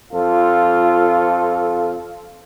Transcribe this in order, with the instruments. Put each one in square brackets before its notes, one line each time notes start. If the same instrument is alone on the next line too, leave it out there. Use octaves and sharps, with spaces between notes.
[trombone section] F2 F4 A4